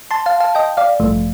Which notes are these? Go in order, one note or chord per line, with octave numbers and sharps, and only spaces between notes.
A5 C6
F5 A5
F5 A5
D#5 G5
D5 F5
A1 G2 F3 A3